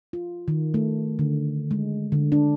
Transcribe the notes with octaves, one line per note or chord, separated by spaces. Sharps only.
F4
D#3
A3
D3
G#3
D3
D4